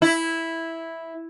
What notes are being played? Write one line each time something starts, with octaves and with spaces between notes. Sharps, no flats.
E4